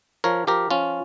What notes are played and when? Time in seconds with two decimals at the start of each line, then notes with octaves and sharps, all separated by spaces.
0.24 F3 A#4 C#5
0.47 F3 G4 A#4
0.71 F3 C#4 F4